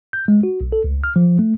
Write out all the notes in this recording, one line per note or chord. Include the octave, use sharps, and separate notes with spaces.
G6
G#3
F#4
B1
A4
C#2
F6
F3
A3